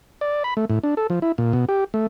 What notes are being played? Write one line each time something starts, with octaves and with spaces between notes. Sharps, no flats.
D5
B5
A3
A2
D4
A4
F3
E4
A#2
B2
G4
A3